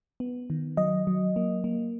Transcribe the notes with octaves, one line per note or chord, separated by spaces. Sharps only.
B3
D#3
F#3 D#5
F#3
A#3
A#3